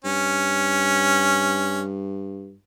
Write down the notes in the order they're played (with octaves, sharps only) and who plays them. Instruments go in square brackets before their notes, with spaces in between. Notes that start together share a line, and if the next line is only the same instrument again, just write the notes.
[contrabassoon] G2 [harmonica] C#4